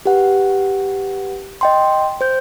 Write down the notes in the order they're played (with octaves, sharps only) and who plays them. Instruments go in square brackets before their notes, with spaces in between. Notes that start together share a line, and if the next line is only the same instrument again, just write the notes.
[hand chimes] G4 B4 F#5
D#5 G5 C6
C5 G6